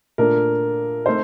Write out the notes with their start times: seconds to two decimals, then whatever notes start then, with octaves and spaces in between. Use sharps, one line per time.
0.18 A#2 A3 D4 A#4
1.06 A3 C4 D#4 C5